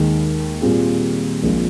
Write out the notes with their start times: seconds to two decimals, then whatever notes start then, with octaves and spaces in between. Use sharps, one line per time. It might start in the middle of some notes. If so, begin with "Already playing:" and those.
Already playing: D#2 D#3 G#3
0.61 A#2 G3 C4 F4 G#4
1.43 A#1 A#2 F3 G#3 C4